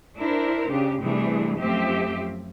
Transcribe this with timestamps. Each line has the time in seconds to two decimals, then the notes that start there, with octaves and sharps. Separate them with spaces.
0.17 D4 E4 A#4 C5
0.69 C#3 D4 G4
1.02 C3 E3 G3 A3 D4 G#4
1.59 F#2 F3 A3 C4 G4 E5